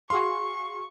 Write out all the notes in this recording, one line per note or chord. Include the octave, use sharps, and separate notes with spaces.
F#4 G#4 F5 C6 C#6